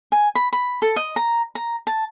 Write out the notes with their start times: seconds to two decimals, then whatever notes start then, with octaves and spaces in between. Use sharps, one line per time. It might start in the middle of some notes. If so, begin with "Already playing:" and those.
0.12 G#5
0.35 B5
0.53 B5
0.82 A4
0.96 D#5
1.16 A#5
1.55 A#5
1.87 A5